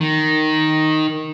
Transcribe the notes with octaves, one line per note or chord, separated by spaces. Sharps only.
D#3